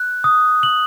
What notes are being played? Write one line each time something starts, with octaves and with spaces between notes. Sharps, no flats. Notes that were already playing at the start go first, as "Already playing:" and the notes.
Already playing: F#6
D#6
F#7